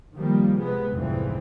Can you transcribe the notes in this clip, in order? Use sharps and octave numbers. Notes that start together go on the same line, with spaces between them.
D#3 F3 G3 A#3
C3 G#3 B3
C2 F2 G#2 D3 E3 C4